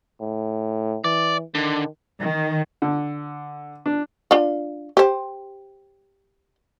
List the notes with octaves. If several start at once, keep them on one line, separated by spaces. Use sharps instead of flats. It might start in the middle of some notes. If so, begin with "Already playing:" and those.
A2
E3 D5
D3 D#3
D#3
D3
D4
D4 F4
G4 C5